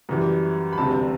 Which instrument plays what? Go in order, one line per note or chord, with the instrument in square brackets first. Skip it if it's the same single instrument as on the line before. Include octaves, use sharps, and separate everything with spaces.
[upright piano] F#2 E3 G3
B5
E1 D2 C3 G3 A5